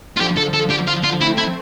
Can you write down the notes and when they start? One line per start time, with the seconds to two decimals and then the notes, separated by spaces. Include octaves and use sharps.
0.16 F4
0.20 D3 F3 G4
0.37 A4
0.53 A4
0.70 G4
0.87 F4
1.04 F4
1.21 A3 C4 E4
1.38 E4